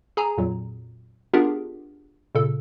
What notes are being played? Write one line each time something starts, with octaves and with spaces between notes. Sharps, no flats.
G#4 G#5 A#5
F2 A#2 F#3
B3 D4 F4 G4 G#4 A#4
A#2 C#3 A4